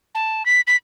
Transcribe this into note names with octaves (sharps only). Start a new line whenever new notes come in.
A5
B6
B6